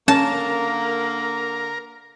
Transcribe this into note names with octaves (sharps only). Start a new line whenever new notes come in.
D3 A#3 C#4 A#4 A5